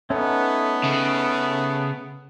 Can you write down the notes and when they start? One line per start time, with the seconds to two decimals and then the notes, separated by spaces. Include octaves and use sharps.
0.10 A3 B3 C#4 D#4
0.84 C#3 A3